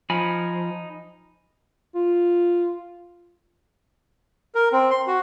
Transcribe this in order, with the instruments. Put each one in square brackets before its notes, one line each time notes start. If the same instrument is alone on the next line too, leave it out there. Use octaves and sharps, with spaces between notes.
[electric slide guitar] F3 [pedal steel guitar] D#4 G#5 B5
[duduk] F4
[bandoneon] A#4
C4
C6
F#4